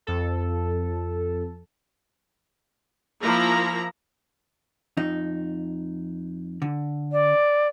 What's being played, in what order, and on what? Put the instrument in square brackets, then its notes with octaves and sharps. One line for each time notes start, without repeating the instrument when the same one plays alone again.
[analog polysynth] F2 A4
[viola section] F3 A#3 E4 A#5
[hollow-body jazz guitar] F2 D#4
D3
[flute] D5